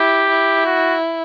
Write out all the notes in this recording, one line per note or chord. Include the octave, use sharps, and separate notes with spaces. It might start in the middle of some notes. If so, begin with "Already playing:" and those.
Already playing: E4 G4
E4
F#4